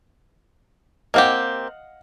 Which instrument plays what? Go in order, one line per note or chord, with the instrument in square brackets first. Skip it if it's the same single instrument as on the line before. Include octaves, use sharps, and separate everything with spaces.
[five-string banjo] A#3 C4 G4 [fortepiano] D#5 F5 F#5